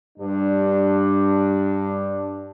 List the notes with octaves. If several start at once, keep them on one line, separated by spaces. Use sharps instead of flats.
G2 D4